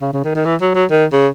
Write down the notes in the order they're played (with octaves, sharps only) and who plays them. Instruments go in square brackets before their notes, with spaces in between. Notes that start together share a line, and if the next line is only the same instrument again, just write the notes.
[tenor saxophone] C#3
C#3
D#3
D#3
E3
F#3
F#3
D#3
C#3